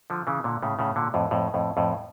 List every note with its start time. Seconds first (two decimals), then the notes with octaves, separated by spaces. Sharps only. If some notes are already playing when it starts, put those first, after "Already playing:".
0.10 D3 F3
0.27 C#3 E3
0.44 A#2 D3
0.62 A2 C#3
0.79 A2 C#3
0.96 A#2 D3
1.14 F2 A2
1.31 F2 A2
1.54 F2 A2
1.77 F2 A2